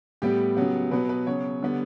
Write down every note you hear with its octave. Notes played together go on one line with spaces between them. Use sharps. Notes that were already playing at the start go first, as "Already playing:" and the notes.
A2 G3 B3 G4
C#3 F#3 B3
B2 F#3 B3 B4
B4
C#3 F#3 B3 C#5
D3 G3 B3